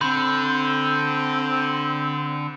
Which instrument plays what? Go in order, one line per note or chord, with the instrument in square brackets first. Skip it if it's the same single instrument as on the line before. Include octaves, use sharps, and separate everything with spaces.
[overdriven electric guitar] D3 [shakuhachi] C4 [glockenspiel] B5 C6 G6